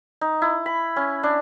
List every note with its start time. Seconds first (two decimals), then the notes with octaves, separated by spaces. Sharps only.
0.21 D#4
0.42 E4
0.66 B5
0.96 C#4
1.23 D4